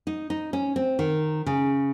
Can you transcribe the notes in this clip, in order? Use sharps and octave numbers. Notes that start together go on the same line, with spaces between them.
D#4
D#4
C#4
C4
D#3
C#3